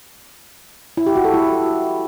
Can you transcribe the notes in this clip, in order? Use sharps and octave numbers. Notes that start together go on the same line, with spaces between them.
E4
G4
F#4
A4
E4